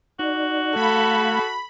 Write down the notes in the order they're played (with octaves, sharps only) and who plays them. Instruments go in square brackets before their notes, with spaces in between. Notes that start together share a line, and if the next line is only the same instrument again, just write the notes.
[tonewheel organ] D#4 D5 [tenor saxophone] F#4
[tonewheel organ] A3 F5 G#6 [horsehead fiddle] A4 [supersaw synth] B5